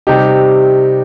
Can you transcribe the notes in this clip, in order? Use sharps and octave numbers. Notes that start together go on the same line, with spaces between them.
C3 G3 D#4 G4